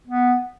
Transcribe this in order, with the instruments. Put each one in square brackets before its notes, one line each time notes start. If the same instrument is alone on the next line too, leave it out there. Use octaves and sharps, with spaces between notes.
[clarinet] B3